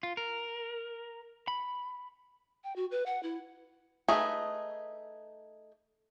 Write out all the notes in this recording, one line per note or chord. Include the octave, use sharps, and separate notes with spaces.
F4
A#4
B5
G5
F#4
B4
F#5
E4
A3 D#4 G#4 B4